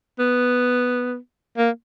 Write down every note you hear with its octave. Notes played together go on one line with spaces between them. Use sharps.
B3
A#3